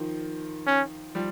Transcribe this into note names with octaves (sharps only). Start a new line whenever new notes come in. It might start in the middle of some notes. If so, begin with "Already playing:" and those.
Already playing: D#3 F3
C#4
F3 G3